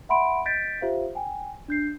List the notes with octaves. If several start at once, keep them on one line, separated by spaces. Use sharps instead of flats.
E5 F#5 B5 C6 D7
D#5 G6 A6 B6 D7
F4 G4 C5 E5 F5
G5 G#5
D4 G6 C7